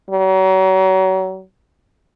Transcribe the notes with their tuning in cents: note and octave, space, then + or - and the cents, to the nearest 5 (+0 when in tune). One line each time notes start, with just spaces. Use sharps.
F#3 +35